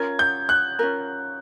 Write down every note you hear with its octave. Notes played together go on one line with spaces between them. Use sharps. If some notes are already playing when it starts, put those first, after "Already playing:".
Already playing: C#4 F4 A#4 G#6
G6
F#6
C#4 F4 A#4